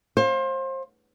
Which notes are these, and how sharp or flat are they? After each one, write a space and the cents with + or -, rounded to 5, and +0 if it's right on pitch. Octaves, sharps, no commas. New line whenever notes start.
C5 +30 F5 +10